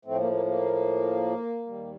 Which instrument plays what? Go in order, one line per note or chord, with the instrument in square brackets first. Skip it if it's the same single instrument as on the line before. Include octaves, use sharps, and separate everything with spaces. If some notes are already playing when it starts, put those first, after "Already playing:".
[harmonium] A2 F3 A3 C4
A#3
A#3
A#3
D#2 D#3 G3